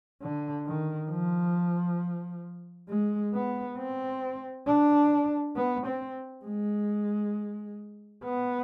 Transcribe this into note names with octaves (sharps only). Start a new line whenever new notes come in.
D3
D#3
F3
G#3
B3
C4
D4
B3
C4
G#3
B3